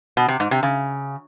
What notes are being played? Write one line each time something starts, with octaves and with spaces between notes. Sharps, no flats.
B2
C3
G#2
C3
C#3